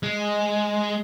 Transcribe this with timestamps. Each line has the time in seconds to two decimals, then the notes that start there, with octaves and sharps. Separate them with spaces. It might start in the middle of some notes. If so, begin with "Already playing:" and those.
0.03 G#3